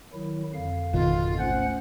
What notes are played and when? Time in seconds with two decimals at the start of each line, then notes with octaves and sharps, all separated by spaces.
0.13 D#3 F#3 E4
0.53 F2 D3 F5
0.93 G#1 B2 D#3 F4
1.38 D2 C#4 C5 F#5